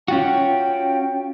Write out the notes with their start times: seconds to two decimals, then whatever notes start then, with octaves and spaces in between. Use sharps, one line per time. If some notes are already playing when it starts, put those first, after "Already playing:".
0.08 C#4 F4 F#4 G5